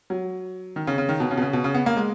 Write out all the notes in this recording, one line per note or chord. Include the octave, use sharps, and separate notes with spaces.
F#3
D#3
C#3
C#3
D#3
B2
C#3
B2
C#3
B2
C#3
B3
A#3
G#3